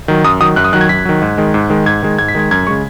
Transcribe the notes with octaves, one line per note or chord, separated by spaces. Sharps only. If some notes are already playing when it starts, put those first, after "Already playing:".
D#3 F#3
F#2 D#6
D#3 F#3 D#6
F#2 F#6
D#6
D#3 F#3 F#6
G#6
F#2 B6
D#3 F#3
G#2
D#3 G#3
G#2
D#3 G#3
G#2 G#6
D#3 G#3
G#2 G#6
B6
D#3 G#3 G#6
F#2 G#6
C#3 G#3 C#6